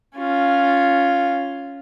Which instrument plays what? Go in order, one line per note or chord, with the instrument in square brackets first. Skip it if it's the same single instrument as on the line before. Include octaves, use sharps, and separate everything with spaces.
[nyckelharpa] C#4 F4